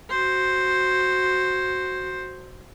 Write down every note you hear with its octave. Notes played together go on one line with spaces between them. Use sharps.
F#4 C5